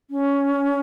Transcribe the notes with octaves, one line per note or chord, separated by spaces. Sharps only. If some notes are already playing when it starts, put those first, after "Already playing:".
C#4